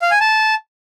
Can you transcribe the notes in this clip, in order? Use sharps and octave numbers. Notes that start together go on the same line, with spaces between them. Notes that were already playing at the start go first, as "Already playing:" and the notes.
F5
G#5
A5